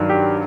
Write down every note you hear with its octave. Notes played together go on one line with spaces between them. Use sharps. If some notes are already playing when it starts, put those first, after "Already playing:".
Already playing: G2 D#3 F#3
G4